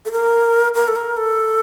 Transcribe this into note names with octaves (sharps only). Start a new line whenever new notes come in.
A4
A#4
A#4
A4
A#4
A4